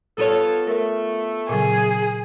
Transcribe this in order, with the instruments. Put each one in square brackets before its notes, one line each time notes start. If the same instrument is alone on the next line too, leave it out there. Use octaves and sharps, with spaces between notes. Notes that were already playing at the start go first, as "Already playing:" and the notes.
[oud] B3 F4 C#5 [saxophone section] A4
[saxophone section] A3 [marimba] A#4
[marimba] A#2 C#3 F#3 [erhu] G#4